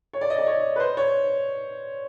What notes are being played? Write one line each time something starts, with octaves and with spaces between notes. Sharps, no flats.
C#5
D5
D#5
D5
C#5
B4
C5
C#5